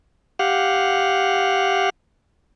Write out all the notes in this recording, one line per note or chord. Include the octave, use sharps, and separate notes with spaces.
G4 F5 F#5